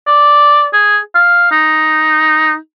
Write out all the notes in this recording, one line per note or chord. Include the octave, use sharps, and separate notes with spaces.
D5
G#4
F5
D#4